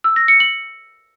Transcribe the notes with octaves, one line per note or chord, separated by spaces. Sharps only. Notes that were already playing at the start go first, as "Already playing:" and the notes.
E6
A#6
C#7
F#7